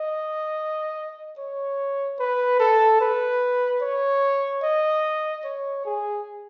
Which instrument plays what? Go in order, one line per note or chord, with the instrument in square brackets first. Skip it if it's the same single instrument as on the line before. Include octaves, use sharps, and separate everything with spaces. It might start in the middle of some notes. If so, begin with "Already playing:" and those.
Already playing: [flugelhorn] D#5
C#5
B4
A4
B4
C#5
D#5
C#5
G#4